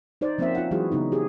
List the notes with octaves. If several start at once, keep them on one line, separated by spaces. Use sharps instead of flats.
D#4 C5 D5
F3 A#3 C4 C#4 C5 E5
F4 F#5
E3 F#3 G#3 E4 F#4 G#4
C#3 B3 D#4
G4 G#4